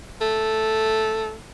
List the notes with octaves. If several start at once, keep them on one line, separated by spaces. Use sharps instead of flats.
A3